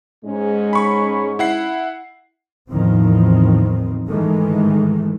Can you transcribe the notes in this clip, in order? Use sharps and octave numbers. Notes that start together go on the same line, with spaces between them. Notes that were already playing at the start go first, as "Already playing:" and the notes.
G#2 G#3 C#4
B5 C#6
E4 F#5 C7
E2 A2 D#3 F3 C4
G#2 D#3 E3 G#3 A3